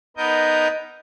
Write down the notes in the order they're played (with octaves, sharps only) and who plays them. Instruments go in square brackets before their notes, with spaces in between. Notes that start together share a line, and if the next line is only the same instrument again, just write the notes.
[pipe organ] B3 D#4 A#4 D#5 G6